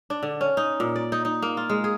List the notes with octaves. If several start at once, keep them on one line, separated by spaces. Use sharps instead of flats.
D4
D3
C#4
D#4
A#2
D5
D#4
D#4
A#3
F4
G#3
G#4